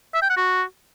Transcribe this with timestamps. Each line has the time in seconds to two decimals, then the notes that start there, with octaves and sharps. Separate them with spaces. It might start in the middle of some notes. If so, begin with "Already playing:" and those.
0.14 E5
0.22 G5
0.30 F#5
0.37 F#4